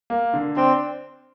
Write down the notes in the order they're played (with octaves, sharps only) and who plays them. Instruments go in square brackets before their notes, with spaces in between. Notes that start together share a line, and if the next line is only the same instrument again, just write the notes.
[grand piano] A#3
D3
[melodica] C4 [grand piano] D4